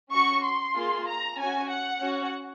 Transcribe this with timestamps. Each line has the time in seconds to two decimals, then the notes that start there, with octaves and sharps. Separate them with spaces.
0.13 C#4 F#4 C#6
0.45 C6
0.77 A#3 F4 G#4
1.08 A#5
1.39 C#4 F#4 G#5
1.71 F#5
2.02 C#4 F#4